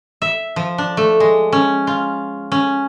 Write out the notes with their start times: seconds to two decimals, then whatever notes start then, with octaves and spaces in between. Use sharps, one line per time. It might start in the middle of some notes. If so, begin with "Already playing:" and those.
0.22 E5
0.56 F3
0.78 D4
0.97 A3
1.20 G#3
1.52 C#4
1.87 F4
2.52 C#4